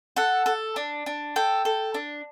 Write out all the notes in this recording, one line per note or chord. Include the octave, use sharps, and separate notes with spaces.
A4 F#5
A4
D4
D4
A4 G5
A4
D4